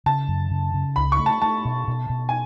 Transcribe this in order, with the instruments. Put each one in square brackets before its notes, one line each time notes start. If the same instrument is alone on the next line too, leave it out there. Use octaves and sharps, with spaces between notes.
[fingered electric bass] C#3 [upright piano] A5
[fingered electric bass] F#2
C#3
C#3
[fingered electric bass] C#2 [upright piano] B5
[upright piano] C#6
[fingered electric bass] A3
[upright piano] A5
[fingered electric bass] A3 [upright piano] A5
[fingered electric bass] B2
B2
B2
[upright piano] G#5